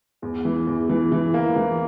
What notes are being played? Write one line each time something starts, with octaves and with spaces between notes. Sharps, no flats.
E2
E3
E2
E3
E3
A#3
E3